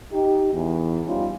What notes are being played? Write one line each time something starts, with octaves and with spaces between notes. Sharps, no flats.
D#4 G4
E2
F3 G3 C#4 D#4 F4